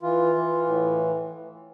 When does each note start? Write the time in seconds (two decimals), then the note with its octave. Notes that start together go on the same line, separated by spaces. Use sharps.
0.02 E3 F4
0.35 E3
0.67 A2